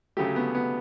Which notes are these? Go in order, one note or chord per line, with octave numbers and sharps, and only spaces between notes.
D2 C#3 F#3 A3 G4
B3
B3